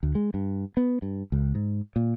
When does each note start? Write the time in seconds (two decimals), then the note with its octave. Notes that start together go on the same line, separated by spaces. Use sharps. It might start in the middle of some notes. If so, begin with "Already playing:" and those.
0.03 D2
0.15 G#3
0.34 G2
0.77 B3
1.02 G2
1.32 C#2
1.55 G#2
1.96 A#2